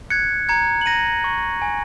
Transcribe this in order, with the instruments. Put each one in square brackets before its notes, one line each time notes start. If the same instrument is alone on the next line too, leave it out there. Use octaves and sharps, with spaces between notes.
[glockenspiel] F#6 G#6 C#7
A#5 G#6 C#7
F#7
A#5 A#6 D#7
C#6
G#5